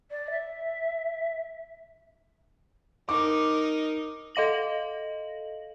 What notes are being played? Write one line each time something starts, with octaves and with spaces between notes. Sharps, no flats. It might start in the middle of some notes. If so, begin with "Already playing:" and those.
D5
E5
D#4 A#4 D6
A4 D#5 F5 A#6 F#7